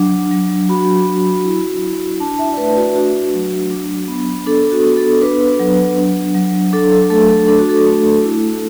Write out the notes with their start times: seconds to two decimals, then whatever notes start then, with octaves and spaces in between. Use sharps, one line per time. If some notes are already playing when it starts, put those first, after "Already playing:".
Already playing: F#3 D4
0.31 F#3
0.69 F#4 B5
1.07 F#4
1.45 E4
1.83 E4
2.20 D4 A5
2.39 E5
2.53 D5
2.57 A3 B4
2.76 F#4
2.96 D4 F#4
3.34 F#3
3.71 D4
4.08 B3
4.46 D4 A4
4.63 A4
4.72 F#4
4.84 B3
4.97 A4
5.21 D4 B4
5.59 F#3
5.97 D4
6.35 F#3
6.73 D4 A4
6.92 A4
7.10 A3 A4
7.29 A4
7.48 D4 A4
7.59 F#4
7.69 A4
7.86 A3
8.24 E4